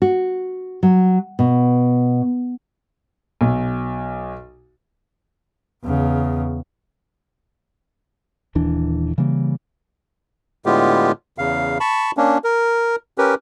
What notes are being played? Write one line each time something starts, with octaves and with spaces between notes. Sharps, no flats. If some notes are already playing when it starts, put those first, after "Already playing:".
F#4
F#3
B2
B1
E2 C#3
D#1 D#2 E3 D4
C#3 E3 G3 A#3
A2 D3 G#3 B3 F4 G4
E2 C#3 F5
A5 B5 C#6
A#3 C#4 D4
A#4
C#4 G4 A#4 B4